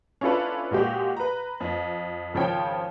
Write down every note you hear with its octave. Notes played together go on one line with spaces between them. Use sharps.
C#4 D4 E4 F4 A4 B4
A#2 G#3 F#4 G4
B4 A#5
F2
G#1 C#3 F3 C#5 G5